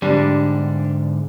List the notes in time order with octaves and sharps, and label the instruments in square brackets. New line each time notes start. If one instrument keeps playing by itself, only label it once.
[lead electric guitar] G#2 D3 [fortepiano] G3 D4